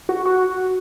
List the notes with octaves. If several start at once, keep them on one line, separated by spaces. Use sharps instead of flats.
F#4
F#4